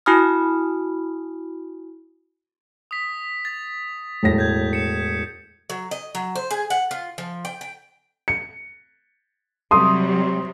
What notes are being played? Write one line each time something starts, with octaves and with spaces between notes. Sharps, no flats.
E4 F#4 G#5 B5 D#6 F6
D#6 B6
A6
E1 A2 A#6
G6 G#6
C#7 E7
F#3
D#5
F#3
C5
G#4
F#5
F4
F3
G5
G5
C#7
C3 F#3 G3 C6 D#6